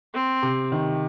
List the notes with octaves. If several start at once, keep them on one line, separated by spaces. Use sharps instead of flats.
C4
C3
D#3